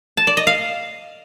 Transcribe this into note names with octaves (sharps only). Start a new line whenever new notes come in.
A5
D5
D#5
F5